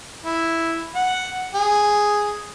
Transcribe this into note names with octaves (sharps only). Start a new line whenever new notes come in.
E4
F#5
G#4